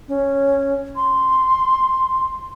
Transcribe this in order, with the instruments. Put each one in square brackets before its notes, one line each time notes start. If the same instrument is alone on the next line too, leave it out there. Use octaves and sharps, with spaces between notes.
[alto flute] C#4
C6